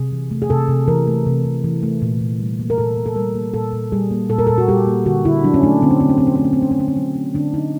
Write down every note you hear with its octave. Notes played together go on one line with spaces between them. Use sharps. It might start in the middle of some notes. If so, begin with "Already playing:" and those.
Already playing: C3 G#4
E3
A3
G#4
C3 A4
C3
E3 A#4
A3
C3
C3
E3
A3
A#2
A#2
G3
A#3
A#4
A#2 A4
A#2
A4
G3 A#4
A#3
A#2 A4
A#2
G3 G#4
A#3
A#2 A4
A#4
A#2 A4
F#4
G3 G4
A#3
D3 F#4
D3 E4
F#3 D4
C#4
A3 D4
D3 C4
C#4
D3 C4
C#4
F#3 C4
C#4
A3 C4
C#4
C4
D3 C#4
C4
D3 C#4
C4
F#3
A3
D3 D4
D3 D#4